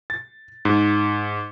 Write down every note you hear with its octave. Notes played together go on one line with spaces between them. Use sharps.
A6
G#2